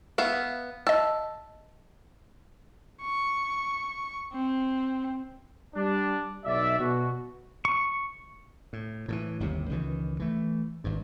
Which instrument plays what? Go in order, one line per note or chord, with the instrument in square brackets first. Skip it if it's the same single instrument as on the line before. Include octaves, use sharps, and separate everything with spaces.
[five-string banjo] B3 E5 F5
[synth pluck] D#5 E6 [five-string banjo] A5
[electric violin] C#6
C4
[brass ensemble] G3 D4
B1 D5 E5
B2 F#4
[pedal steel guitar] C#6
[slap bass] A2
A2 D#3 E3
G1 D#2 C3
C#2 D#3 E3
E3 A3
G#1 G2